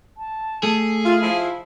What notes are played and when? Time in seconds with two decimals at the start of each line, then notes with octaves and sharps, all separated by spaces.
0.18 A5
0.63 A3 G#4
1.05 F4 E5
1.21 F3 E4